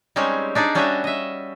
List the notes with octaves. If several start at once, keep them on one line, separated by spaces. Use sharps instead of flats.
G3 G#3 C4 C#4 D#4 G4
D4 D#4 G#4 D5
G3 C#4 D4 F#4 D#5 E5
D#5 E5